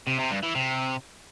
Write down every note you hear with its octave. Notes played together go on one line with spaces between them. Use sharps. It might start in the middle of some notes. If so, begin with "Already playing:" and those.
C3
C3
G2
E3
C3